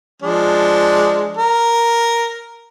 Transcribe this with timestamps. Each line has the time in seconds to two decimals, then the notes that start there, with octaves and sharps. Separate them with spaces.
0.22 F3 G#3 D4
1.37 A#4